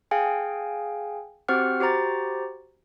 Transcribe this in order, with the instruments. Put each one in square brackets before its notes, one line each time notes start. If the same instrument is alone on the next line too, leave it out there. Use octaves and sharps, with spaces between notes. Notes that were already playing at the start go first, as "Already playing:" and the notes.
[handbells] G#4 F5 G5 G#5
C4 F#4 G4 C5 F#5 F6
F#4 G4 C5 A#5 A6